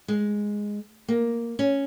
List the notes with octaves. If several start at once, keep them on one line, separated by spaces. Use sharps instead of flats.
G#3
A#3
C#4